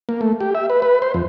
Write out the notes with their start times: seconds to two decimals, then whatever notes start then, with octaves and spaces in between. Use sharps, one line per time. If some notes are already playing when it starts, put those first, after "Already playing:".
0.09 A#3
0.21 A3
0.40 G4
0.55 E5
0.70 B4
0.82 B4
1.02 C5
1.14 F2